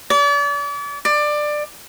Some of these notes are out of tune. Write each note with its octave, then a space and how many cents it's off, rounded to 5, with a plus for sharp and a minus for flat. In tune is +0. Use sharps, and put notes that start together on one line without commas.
D5 -40
D5 +20